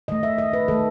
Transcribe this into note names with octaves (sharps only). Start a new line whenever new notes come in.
D#3 A3 D#5
E5
D#5
B4
D#3 A3 A4